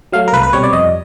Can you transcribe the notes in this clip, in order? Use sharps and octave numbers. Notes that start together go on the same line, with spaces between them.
F#3 A3 F5
A#4
C2 B4
B4
B2 G3 C4 C#5
D5
F2 D#5